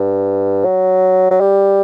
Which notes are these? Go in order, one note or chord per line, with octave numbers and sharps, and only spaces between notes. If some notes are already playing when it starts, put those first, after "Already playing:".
Already playing: G2
F#3
F#3
G3